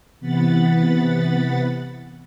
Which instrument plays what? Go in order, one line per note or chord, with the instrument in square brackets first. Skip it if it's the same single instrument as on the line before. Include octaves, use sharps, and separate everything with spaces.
[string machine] C3 E3 B3 F#5 B5 A6